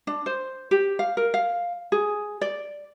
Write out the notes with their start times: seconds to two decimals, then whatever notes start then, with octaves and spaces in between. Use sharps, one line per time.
0.07 D4
0.26 C5
0.71 G4
0.99 F5
1.17 A#4
1.34 F5
1.92 G#4
2.41 D5